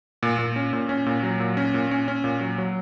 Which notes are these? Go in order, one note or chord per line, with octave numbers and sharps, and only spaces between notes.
A#2
A#2
C#4
A#2
C#4
A#2
F#3
A#2
C#4
A#2
C#4
C#4
A#2
F#3
F#3